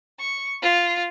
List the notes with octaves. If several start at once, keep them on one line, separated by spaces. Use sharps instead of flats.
C#6
F4